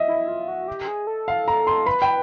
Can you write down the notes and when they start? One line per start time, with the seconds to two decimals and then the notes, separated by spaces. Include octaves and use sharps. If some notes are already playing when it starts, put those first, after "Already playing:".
Already playing: D#5 E5
0.08 E4
0.28 F4
0.48 F#4
0.68 G4
0.88 G#4
1.07 A4
1.28 F5
1.48 A#5
1.67 C6
1.86 B4 B5
2.02 G5